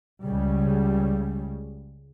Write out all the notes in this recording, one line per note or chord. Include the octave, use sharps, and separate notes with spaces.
C#2 C#3 G3